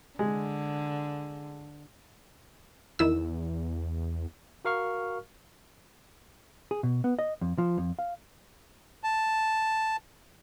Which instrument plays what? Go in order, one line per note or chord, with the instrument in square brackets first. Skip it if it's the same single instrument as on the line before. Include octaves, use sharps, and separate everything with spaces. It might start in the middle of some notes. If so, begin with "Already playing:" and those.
[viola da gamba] D3 [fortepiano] G#3
[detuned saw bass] E2 [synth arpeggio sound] D#3 E4 E6
[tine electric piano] F#4 A#4 F5 C#6 F6
[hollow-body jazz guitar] G#4
B2
B3
D#5
F2
F3
F2
F5
[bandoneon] A5